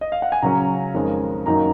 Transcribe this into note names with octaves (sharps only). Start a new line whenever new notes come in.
D#5
F5
F#5
G#5
C#3 F#3 C#4 A#5
F2 D#3 G#3 C#4
F#2 D#3 F#3 A#3 D#4 A#5